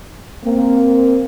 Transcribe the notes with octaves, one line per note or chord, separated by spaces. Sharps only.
A#3 C4